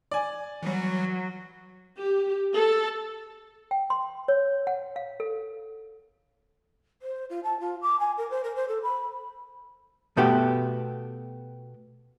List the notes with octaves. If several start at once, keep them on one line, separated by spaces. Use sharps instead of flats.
D5 G#5
E3 F#3 G3
G4
A4
G5
C6
C#5
F#5
F5
A4
C5
F4
A5
F4
D6
G#5
A#4
C5
A#4
C5
A4
B5
B2 A3 B3 F#4 G4